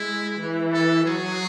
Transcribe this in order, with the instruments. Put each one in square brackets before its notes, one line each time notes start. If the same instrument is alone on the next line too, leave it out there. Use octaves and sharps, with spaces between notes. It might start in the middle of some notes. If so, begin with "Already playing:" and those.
Already playing: [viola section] G#3 [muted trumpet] E4
[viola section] E3
[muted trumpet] A4
[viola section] F#3 [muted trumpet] G#4